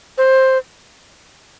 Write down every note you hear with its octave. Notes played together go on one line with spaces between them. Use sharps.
C5